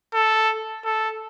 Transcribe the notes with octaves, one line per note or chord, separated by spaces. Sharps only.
A4
A4